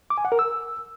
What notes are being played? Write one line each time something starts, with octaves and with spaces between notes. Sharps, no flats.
D6
G#5
F#5
A#4
E6